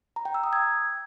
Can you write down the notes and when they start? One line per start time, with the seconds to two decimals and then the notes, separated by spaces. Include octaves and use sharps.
0.16 A#5
0.25 G5
0.34 E6
0.44 D#6
0.53 G#6